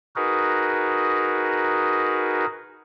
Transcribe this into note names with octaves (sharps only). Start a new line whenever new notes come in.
D#4 F#4 G#4 A#4 B4